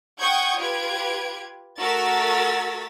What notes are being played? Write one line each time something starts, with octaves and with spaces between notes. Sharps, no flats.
F#5 G5 C#6 D#6 G6 G#6
F4 G4 B4 G#6 D7
A3 F#4 A#4 E6 A6 B6